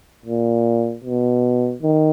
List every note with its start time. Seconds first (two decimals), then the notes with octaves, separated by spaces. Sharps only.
0.25 A#2
1.04 B2
1.82 D#3